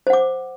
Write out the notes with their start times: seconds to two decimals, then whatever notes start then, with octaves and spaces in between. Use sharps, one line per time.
0.07 C5
0.10 F#5
0.13 D6